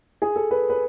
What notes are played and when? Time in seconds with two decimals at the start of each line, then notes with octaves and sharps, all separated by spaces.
0.22 G#4
0.36 A4
0.51 B4
0.70 B4